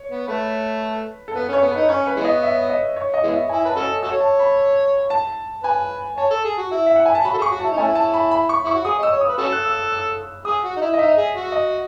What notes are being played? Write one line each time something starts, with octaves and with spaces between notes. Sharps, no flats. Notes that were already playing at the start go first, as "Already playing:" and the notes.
Already playing: C#5
B3
A3 B4
A4
B3 B4
C#4
C#5
B3
D#4 B4
C#4 C#5
B4
E3 G#3 B3
D#5
E5
D#5
C#5
D#5
E3 G#3 B3
E5
E4 G#5
B4 A5
C#4 F#4 A4
F#4 A4 C#5 E6
A5
B5
A5
B4 G#5
C#5 A5
A4
G#4
F#4
E4
E5
F#5
G#5
A5
F#4 B5
A4
G#4
C#6
F#4
E4 A5
D#4
A3 C#4 E4 G#5
A5
B5
B5
C#6
E4 C#6
F#4
G#4 D#6
D#5
E6
C#5
D#6
B4
C#4 F#4 A4 E6
F#6
E6
E6
E6
G#4 D#6
F#4
D#4
E4
D#5
D#4 E5
G#4
F#4
D#5